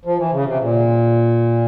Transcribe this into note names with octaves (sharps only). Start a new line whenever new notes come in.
F3
E3
C#3
C3
A#2